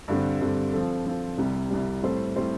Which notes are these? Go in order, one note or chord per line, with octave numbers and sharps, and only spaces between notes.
G2 D3 G3 C4
G2 D3 G3 C4
F3 C4 A4
F3 C4 A4
C2 C3 G3
C2 C3 G3
A2 G3 C4 A4 C5
A2 G3 C4 A4 C5